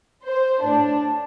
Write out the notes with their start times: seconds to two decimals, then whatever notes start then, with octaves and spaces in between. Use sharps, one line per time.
0.25 C5
0.63 A2 D4